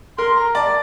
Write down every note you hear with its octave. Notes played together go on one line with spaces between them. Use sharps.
A#4 C6
A#5
D5 A5